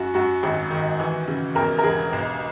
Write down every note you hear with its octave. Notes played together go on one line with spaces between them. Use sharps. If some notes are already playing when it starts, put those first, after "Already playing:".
Already playing: F#2 F#4
F#2 F#4
G#1
D#3
E3
C#3
E2 A#4
A#4
E1 G#4
B1